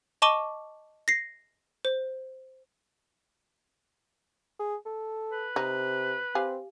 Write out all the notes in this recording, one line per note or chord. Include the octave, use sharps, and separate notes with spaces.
D#5 A5 C#6 D6 D#7 G7
A#6 C7
C5
G#4
A4
B4
C3 D#4
C4 G4 F5 G#5